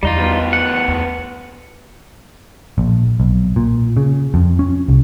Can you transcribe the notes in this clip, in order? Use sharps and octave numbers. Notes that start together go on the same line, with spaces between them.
E2 D#3 G3 D#4 F4
D2 B3
F#5
E2
A#1
B1
A#2
C#3
F2
C#4
C2